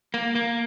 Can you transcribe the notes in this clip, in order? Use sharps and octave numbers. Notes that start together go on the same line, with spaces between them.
A#3
A#3